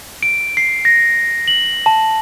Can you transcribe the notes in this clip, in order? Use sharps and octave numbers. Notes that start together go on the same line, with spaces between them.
D7
C7
A#6
F#7
A5